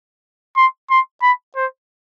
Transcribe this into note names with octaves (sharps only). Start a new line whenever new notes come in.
C6
C6
B5
C5